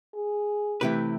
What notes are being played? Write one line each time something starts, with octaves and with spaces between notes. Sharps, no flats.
G#4
C3 E3 A3 E4 G4 B4